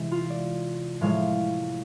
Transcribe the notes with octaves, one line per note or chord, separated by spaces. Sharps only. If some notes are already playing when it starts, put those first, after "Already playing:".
Already playing: C3 E3 G#3
F4
D5
A2 F3 G#3 F5